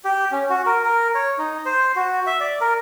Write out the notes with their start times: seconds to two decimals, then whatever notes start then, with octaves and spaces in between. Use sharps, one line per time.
0.05 G4
0.32 C#4
0.50 F#4
0.66 A#4
0.85 A#4
1.15 C#5
1.38 D#4
1.66 C5
1.96 F#4
2.27 E5
2.40 D5
2.61 A#4